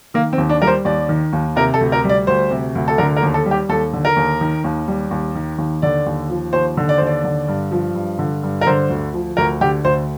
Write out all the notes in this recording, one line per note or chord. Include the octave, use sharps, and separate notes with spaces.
D#3 A#3
C4
D#2
D4
G3 A#4
C5
D#2 D5
D#3
D#2
C3 A#4
A4
D2
A#4
G3
D5
D2 C5
C3
D2
A4
D3 A#4
A#4
D#2
A4
G3
G4
D#2 A4
D3
A#4
D#2
D#3
D#2
G3
D#2
D#3
D#2
D3 D5
D#2
F3
D#2 C5
D3
D5
D#2 C5
D5
D3
G2
F3
G2
D3
G2
A#4
D3 C5
D2
F3
D2 A#4
D3 G4
D2 C5